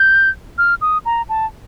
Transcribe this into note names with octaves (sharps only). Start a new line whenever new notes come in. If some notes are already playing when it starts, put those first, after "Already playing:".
Already playing: G6
F6
D#6
A#5
A5